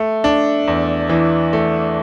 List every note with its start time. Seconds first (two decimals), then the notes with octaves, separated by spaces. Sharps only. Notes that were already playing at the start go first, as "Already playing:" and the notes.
Already playing: A3
0.24 D4
0.68 E2
1.09 E3
1.53 A3